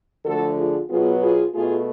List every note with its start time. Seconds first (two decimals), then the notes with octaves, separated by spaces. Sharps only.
0.25 D3 F3 A3 F#4 A4
0.57 F4 G#4
0.89 B2 F#3 B3 F4 G#4
1.21 F4 G#4
1.53 B2 A3 F4 G#4